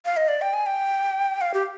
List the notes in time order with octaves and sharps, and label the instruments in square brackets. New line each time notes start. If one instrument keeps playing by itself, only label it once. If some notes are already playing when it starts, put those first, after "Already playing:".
[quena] F5
D#5
D5
G5
G#5
G5
F5
G4